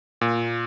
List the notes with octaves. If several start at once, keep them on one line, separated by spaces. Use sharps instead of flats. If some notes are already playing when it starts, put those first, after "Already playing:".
A#2